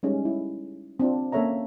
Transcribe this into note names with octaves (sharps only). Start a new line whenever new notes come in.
G3 G#3 C#4 D#4
E4
C4 D4 F4
A#3 C#4 A4 C#5 E5 A#5